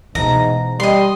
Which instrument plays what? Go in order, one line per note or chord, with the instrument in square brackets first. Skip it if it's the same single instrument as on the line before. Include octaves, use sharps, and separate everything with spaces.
[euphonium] G#2 [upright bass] B2 E3 [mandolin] A#5
[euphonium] G3 [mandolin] D#5 C6